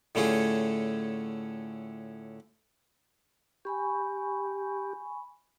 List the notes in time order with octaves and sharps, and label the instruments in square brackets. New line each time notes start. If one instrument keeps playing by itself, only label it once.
[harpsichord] A2 D3 A3 C#4 F4 G#4
[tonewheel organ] G4 [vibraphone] G#5 B5 C#6